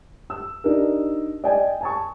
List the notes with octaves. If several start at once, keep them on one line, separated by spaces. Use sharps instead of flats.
E6
D4 D#4 G4 A#4
D5 D#5 G5 G#5
G#5 A5 C#6